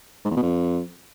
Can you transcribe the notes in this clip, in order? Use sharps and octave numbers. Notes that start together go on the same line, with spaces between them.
G#2
E2
B2
F2